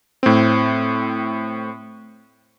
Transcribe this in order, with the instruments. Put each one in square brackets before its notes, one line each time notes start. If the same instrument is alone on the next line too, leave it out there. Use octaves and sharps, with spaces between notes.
[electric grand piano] A2 C4